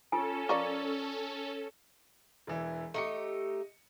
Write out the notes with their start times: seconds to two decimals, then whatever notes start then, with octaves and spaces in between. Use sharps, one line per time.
0.12 C#4 F4 A4 G#5
0.49 F4 A#4 D5 C#6
2.47 E1 E3 E4
2.94 A3 D#4 G4 D#5 C#7